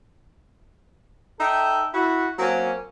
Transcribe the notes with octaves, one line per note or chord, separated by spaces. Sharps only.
D#4 A4 E5 G5
E4 F#4
F#3 A#3 C4 C#4